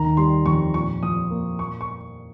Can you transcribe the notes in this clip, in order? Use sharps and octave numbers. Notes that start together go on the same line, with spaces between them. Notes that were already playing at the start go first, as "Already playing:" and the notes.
Already playing: D#2 D#3 A#5
G3 C6
F2 C#6
A#2 C#6
F3 D#6
A#3
A#2 C#6
C#6